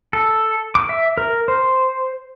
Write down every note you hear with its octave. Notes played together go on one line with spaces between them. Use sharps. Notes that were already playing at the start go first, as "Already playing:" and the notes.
A4
D6
E5
A#4
C5